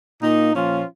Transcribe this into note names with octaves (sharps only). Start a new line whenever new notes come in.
A#2 A#3 D#4
A#2 F3 C#4 F4